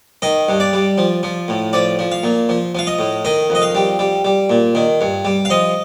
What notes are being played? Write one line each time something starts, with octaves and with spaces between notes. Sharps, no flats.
D#3 D#5
G2
D5
G3
F3
F3
A2
F3 D5
F3
F5
A#2
F3
F3 F5
D#5
A2
D#3 D#5
F2 D#5
F5
G3
G3
G3
A#2
D#3
G2
G3
F5
F3 D#5